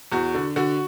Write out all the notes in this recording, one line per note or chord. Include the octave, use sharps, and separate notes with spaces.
E2 F#4
D3
D3 F#4